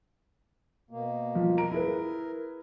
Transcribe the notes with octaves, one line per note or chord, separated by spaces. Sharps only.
B2 A#3
F3
A#4 A#5 D7
E4 G#4 B4